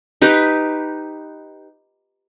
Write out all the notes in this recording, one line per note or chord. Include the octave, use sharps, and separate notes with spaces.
D#4 G4 B4